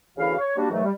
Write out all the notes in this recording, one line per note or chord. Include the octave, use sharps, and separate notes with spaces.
D2 C#3 E3 E4 F#4 F5
C#5
G3 A#3 D4 F#4
G#2 D#3 E3 F#3 A3
G3